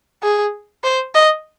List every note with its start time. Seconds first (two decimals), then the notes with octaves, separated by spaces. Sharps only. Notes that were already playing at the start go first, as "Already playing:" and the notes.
0.23 G#4
0.84 C5
1.15 D#5